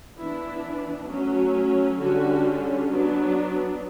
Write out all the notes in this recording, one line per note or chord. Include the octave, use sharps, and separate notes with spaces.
E3 B3 D4 E4
F#3 A3 C#4
D3 G3 C#4 F#4
F#3 B3 D4